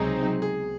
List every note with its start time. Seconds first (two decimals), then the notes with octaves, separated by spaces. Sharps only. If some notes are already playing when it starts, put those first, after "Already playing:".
Already playing: C#2 C3 F#3 C4 D#4 G#4
0.42 G#4